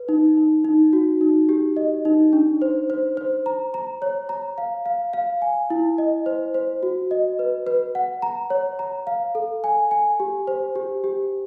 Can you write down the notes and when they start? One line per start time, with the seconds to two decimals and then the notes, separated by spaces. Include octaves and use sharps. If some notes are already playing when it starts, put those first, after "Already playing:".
Already playing: B4
0.09 D#4
0.37 D#4
0.65 D#4
0.93 F#4
1.21 D#4
1.49 G4
1.77 D#5
2.05 D#4
2.33 D4
2.62 C5
2.90 C5
3.17 C5
3.46 A#5
3.74 A#5
4.02 C#5
4.29 A#5
4.58 F5
4.86 F5
5.13 F5
5.42 G#5
5.70 E4
5.98 D#5
6.26 C5
6.54 C5
6.83 F#4
7.11 D#5
7.39 B4
7.67 B4
7.95 F#5
8.22 A#5
8.50 C#5
8.79 A#5
9.07 F5
9.35 A4
9.64 G#5
9.91 G#5
10.20 G4
10.47 C5
10.76 G4
11.04 G4